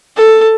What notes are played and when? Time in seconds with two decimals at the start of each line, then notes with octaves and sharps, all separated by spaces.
0.17 A4